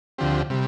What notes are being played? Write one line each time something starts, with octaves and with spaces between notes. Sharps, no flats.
D2 D3 F3 C4 G4
C3 G3